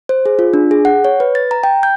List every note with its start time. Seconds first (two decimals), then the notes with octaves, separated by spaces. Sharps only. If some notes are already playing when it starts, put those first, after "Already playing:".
0.09 C5
0.26 G#4
0.39 F4
0.53 D4
0.71 G#4
0.85 F#5
1.05 C#5
1.20 B4
1.35 A6
1.51 A#5
1.64 G5
1.83 G6